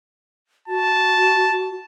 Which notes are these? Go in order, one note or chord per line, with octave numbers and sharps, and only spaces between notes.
F#4 A5